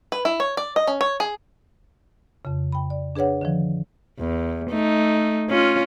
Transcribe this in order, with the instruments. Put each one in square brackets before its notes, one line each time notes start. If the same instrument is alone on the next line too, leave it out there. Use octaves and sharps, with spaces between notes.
[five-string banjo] B4
E4
C#5
D5
D#5
C#4
C#5
G#4
[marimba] F2 C#3
G5 B5
D5
D4 G#4 B4 C#5 F#5
D3 D#3 F3
[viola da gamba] E2
A3 D#4
C#4 F4